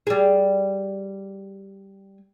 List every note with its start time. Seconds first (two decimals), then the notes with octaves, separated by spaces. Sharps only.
0.07 G3 G#4